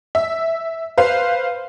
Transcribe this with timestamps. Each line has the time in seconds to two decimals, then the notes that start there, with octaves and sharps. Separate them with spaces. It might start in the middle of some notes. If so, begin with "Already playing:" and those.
0.15 E5
0.98 B4 C5 F5